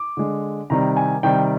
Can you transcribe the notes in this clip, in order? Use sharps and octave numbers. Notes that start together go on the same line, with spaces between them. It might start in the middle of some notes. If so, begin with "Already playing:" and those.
Already playing: D6
D3 G#3
C3 D#3 G3 A#5
G#5
C3 D#3 G3 G5